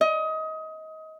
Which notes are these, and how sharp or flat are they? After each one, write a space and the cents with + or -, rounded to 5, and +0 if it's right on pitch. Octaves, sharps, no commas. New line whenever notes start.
D#5 +25